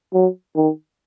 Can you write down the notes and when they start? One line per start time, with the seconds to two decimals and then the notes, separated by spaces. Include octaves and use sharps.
0.14 F#3
0.56 D#3